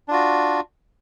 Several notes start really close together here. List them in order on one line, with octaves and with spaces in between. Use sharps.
D4 F4 F#4